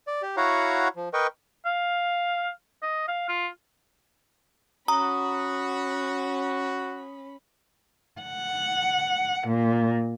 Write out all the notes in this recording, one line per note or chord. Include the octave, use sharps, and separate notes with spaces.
D5
G4
E4 F#4 C#5 F5 F#5 A#5
F3
A#4 B4 D#5 G5 C#6
F5
D#5
F5
F4
C#4 F#4 A#5 B5 D#6
F#5
A#2